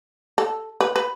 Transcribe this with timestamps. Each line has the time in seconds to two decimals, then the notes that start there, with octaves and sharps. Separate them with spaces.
0.38 A4
0.81 B4
0.96 B4